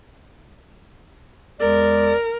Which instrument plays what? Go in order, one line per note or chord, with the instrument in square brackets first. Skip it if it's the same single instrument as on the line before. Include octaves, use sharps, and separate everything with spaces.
[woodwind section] E2 G#3 D5 [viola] A#4